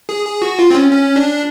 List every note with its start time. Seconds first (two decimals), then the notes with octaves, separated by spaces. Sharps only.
0.09 G#4
0.26 G#4
0.42 F#4
0.59 F4
0.70 C4
0.75 C#4
0.91 C#4
1.16 D4